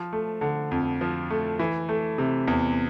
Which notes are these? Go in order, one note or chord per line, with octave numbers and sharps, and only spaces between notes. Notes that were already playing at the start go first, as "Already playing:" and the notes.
Already playing: F3
A3
D3
F2
F3
A3
E3
A3
C3
E2